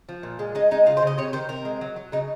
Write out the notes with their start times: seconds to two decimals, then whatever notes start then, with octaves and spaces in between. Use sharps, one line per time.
0.09 F3
0.23 A#2
0.39 G#3
0.55 G#3 D#4
0.71 G#3 D#4
0.86 C#3 F4
0.97 C5
1.02 C#3 D#5
1.18 C3 C#5
1.33 D#3 C5
1.49 C3 A#4
1.65 G#3
1.81 F#3
1.96 F#3
2.12 C#3 D#4